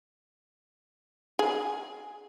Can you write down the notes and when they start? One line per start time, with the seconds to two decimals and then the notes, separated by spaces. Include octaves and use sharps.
1.39 G#4